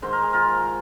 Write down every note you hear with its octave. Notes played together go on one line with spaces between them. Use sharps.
G#2 D#3 C5
A#4
G#4
F4 A#4